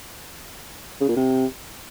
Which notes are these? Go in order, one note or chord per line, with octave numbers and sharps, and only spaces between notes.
C#3
A#2
C3